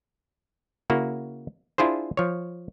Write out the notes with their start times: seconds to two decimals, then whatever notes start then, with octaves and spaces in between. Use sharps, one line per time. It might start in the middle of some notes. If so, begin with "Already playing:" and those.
0.90 C#3 A#3 E4 F#4
1.78 D4 E4 F4 G#4 C5
2.17 F3 C#5